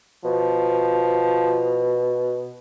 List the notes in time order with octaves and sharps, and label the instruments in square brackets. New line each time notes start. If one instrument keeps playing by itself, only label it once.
[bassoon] B2 [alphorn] F3